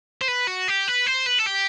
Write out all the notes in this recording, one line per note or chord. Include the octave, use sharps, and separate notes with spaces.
C5
B4
F#4
G4
B4
C5
B4
A4
G4